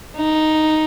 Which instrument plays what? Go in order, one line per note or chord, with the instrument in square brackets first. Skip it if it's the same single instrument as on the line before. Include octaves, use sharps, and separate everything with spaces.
[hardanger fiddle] D#4